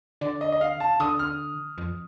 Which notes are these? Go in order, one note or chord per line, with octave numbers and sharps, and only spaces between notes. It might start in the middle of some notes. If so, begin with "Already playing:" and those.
D3 D5
D#5
D#5
F5
A5
D3 D#6
F6
F2